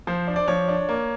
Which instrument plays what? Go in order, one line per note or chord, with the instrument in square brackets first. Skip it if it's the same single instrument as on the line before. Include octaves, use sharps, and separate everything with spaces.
[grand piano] F3 C5
D4
D5
F3 C#5
D4
A#3